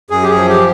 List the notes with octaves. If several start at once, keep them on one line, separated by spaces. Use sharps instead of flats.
F#2 G#4
G4
G#4
F3
G4